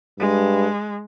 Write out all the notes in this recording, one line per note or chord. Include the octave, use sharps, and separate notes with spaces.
G2 G#3